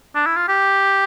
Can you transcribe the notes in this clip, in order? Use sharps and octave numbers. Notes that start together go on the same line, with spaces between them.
D4
E4
F4
G4